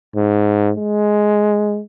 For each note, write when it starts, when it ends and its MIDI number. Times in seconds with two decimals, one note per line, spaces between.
0.16 0.72 44
0.77 1.81 56